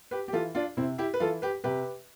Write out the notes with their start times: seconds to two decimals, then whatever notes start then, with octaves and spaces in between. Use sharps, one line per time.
0.11 G4 B4
0.28 G4
0.33 E3 F4 A4
0.55 D4 F4
0.77 C3 C4 E4
0.98 E4 G4
1.14 B4
1.20 E3 F4 A4
1.42 G4 B4
1.64 C3 G4 B4